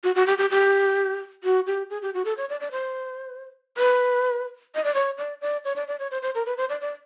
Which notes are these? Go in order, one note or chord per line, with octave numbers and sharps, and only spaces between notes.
F#4
F#4
G4
G4
G4
F#4
G4
G#4
G4
F#4
A4
C#5
D5
D5
C5
B4
D#5
D5
C#5
D5
D5
C#5
D5
D5
C#5
C5
C5
A#4
B4
C5
D5
D5